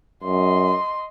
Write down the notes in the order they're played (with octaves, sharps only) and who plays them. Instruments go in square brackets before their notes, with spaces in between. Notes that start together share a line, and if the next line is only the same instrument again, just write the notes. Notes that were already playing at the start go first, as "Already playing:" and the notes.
[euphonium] F#2 [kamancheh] D#5 C6